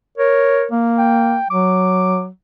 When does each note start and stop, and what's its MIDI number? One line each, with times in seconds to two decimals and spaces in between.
0.18 0.67 70
0.18 0.66 73
0.71 1.38 58
0.98 1.45 79
1.50 2.28 54
1.50 2.22 86